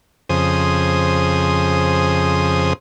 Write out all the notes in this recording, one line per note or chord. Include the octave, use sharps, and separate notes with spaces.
F2 C#3 G#4 C5 D#6